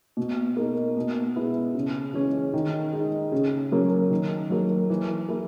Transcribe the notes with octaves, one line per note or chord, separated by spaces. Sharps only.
B2
A#3 D#4
B2
G#3 B3 E4
C#3
E3 G#3 C#4
D#3
G#3 D#4
C#3
F#3 A#3 C#4
D#3
F#3 A#3
E3
A#3 E4